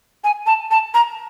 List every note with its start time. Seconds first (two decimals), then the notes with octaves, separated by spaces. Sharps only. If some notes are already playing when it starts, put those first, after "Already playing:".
0.24 G#5
0.46 A5
0.71 A5
0.94 A#5